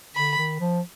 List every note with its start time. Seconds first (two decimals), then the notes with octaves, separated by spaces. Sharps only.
0.15 D3 B5
0.38 D#3
0.60 F3